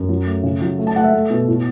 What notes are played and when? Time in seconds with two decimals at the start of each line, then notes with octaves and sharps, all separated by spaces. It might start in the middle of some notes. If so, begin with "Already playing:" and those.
Already playing: F#2
0.09 F#3
0.26 A3
0.43 C#3
0.61 F#3
0.79 A3
0.87 A5
0.96 A3 F#5
1.04 E5
1.13 A3
1.30 B2
1.48 A2